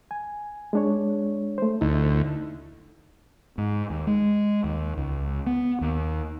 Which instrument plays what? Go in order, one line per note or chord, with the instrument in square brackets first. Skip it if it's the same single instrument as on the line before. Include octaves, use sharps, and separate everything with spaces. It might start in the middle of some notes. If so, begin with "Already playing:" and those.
[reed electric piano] G#5
G#3 D4 C#5
A3 C5
[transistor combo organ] D2 [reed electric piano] D#4 E4
[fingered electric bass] G#2
D#2
G#3
D#2
C#2
B3
D#2